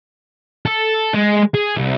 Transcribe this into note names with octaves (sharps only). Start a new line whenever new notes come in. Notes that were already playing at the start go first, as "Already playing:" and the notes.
A4
G#3
G#4
C2